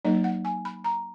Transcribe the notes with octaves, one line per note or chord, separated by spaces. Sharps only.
F#3 A#3 D#4 D#5
F#5
G#5
B5
A#5